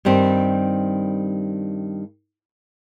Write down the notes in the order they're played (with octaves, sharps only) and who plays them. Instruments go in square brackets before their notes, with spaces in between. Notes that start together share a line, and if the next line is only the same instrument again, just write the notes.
[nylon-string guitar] G2 D#3 G3 C4